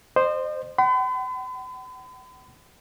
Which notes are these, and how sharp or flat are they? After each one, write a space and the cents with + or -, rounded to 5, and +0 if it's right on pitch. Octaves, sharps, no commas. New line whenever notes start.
C5 +0 D#5 -40
F#5 +45 B5 +45